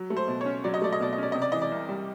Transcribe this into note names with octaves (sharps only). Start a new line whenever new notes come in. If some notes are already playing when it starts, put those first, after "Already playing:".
Already playing: F#3
A3
C5
B2
C#5
C#4
F#3 D5
D#5
A3 D5
D#5
B2 D5
D#5
C#4 D5
C3 D#5
D5
E3 D#5
D5
C2
G3